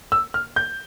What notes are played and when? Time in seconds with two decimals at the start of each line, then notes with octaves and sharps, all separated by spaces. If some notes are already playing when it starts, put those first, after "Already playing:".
0.12 E6
0.34 F6
0.56 G6